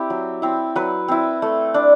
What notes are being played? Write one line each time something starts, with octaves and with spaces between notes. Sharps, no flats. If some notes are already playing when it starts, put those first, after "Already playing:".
Already playing: C4 E4 G4
F#3
C4 E4
F#3 B4
C4 E4
A3
D4